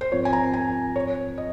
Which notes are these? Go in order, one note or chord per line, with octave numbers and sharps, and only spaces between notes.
C5
G#2 F3 C4 F4 A#4 C#5
G#5
A#5
G#5
C#5
D#5